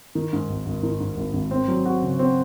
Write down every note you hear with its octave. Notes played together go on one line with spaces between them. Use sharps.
D#3
G#2
G#1
G#1
D#3
G#2
G#1
G#1
C4
F#3
F#4
C#3
C4